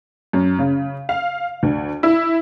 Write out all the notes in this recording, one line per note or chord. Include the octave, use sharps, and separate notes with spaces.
F#2
C#3
F5
D2
E4